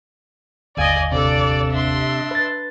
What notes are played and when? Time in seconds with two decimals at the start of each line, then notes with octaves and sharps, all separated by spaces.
0.77 G1 D#2 D5 D#5 F5 G#5
1.12 C3 D4 A4 D5
1.71 D4 E5 C6
2.31 B4 A6